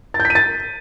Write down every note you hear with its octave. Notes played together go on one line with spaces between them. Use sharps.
A6
G6
B6
D#7
A6